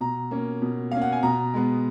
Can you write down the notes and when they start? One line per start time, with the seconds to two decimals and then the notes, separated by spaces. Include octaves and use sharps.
0.01 B2 A#5
0.31 A#3 C#4
0.62 B2
0.91 A#3 C#4 F5
1.02 F#5
1.12 G#5
1.23 B2 A#5
1.54 G#3 B3